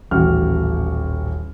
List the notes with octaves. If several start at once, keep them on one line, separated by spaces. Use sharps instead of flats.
D#1 A1 F#4 G4 F6